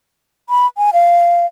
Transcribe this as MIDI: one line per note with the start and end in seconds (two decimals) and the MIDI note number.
0.50 0.67 83
0.77 0.90 80
0.93 1.46 77